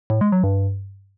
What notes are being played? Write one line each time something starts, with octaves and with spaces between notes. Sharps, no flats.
A2
G#3
F#3
G2